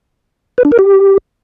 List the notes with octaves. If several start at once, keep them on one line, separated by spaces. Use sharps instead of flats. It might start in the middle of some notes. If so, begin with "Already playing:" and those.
B4
D4
A#4
G4